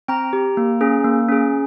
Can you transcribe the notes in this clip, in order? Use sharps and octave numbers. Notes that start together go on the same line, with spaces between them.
C4 G5 A#5
G4
A#3
C#4 G#4
A#3
C#4 G#4